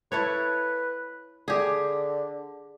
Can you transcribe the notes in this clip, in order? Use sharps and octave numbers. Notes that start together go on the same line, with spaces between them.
E4 A4 B4 C#5
D3 G4 G#4